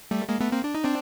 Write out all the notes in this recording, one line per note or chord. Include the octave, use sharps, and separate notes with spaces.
G3 A3
G#3 A#3
A3 B3
A#3 C4
D4
D#4
C4 D4